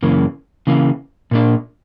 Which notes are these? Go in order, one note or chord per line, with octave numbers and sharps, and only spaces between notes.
F#2 C#3 E3 A#3
C#3 E3 A#3
A#2 A#3 D4